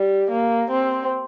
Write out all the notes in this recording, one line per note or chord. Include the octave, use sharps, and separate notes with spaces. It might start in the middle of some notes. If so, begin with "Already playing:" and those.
Already playing: G3
A#3
C4